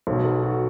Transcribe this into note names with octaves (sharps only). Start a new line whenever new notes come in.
B1 B2 A4
A4
F#4